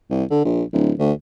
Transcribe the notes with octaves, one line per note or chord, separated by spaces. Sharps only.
C2
D3
A#1
D1
D2